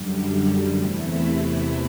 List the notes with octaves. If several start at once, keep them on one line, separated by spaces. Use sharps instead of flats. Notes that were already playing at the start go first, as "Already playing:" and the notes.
Already playing: F#2 D3 G3
E2 C3 E3 A3 E4